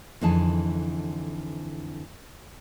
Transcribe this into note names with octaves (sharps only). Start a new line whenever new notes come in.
F2 D3 E3 D#4 G#4 A5